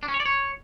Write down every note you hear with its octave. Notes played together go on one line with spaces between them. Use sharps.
D4
C#4
C#5
D5
C#5